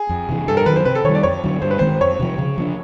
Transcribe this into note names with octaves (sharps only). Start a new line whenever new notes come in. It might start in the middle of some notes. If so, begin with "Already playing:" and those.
Already playing: G#4
F2
C3 E3
G2 A4
A#4
D#3 F#3 B4
C5
C3 B4
A4
D#3 G3 C#5
D5
F2 C#5
D3 F#3
G2 C5
B4
D#3 G#3 C4 C5
F2 C#5
C3 F3
C#3
F3 A#3 D4